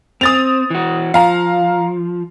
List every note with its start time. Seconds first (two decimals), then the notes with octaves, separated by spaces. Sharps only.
0.21 C4 D#6 A6 F7
0.70 E3 F#4
1.14 F3 F5 A#5